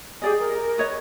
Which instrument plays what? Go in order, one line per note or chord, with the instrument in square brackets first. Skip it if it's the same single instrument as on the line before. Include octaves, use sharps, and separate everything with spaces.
[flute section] G4 G#5 [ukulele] G#4 D5 D#5
[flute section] A#4
[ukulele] B4 C#5 D#5